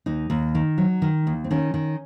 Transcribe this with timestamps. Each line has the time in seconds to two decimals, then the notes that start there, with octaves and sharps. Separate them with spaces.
0.06 D#2 D#4
0.30 D#2
0.55 D#3
0.78 F#3
1.02 D#3
1.27 D#2
1.44 C4
1.51 D#3 C#4
1.74 D#3